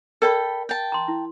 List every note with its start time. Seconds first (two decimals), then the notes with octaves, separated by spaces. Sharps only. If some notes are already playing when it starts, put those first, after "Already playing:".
0.22 A4 A#4 D5 G5 B5
0.69 G5 A5
0.92 A#5 C6
1.08 E4